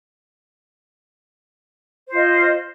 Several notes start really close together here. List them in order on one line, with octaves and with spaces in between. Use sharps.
C5 F4 D#5